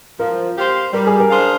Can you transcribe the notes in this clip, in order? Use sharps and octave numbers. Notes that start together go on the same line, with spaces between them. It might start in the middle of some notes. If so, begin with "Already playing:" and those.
F3 A#4
C4 G4 C5 F5
G3 A#4
G#4
A#4
D4 G#4 C5 F5